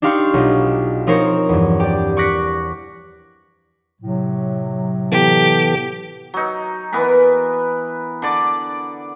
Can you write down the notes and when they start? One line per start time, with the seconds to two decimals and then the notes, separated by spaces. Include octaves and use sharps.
0.02 D4 D#4 G4 F5 C6 C#6
0.34 B1 F4
1.07 F3 C4 D#4 A#4 C5 C#5
1.49 E2 G2
1.80 G4 D5
2.17 C#6 D6 F#6 A#6 B6 C#7
4.01 A2 C3 F#3
5.12 E3 B3 G4 A4
6.34 F#3 D#4
6.92 E3 B3 A#4 B4
8.22 D3 D5 D6